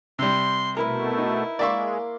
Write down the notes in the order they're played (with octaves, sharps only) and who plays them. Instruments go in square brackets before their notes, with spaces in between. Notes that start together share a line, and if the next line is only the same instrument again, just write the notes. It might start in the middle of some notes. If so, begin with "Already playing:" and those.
[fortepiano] C3 G3 [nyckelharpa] C6
[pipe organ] B2 A3 [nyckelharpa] E4 [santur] A#4 B4 E5
[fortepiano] D#4
[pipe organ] G#3 [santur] A#3 C6 [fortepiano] D5 E5 C#6